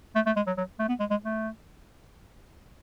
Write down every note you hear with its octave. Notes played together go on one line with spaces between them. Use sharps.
A3
A3
G#3
F#3
F#3
A3
B3
G#3
G#3
A3